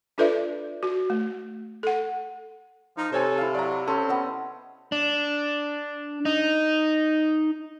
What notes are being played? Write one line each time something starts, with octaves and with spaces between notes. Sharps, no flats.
D4 F4 A4 B4 D5 E5
F#4
A3
A4 F#5
F3 D#4
C3 A4 C5 C#5 G#5
E4 F5
F#3 D5 A#5
C4 C#4 A4
B3 D#5
D4
D#4